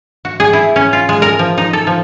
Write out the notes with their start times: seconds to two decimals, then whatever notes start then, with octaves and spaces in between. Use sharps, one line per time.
0.25 F#4
0.40 G#4
0.53 E4
0.76 C#4
0.93 F4
1.09 G#3
1.22 A#4
1.39 F3
1.58 D#4
1.73 A4
1.87 F3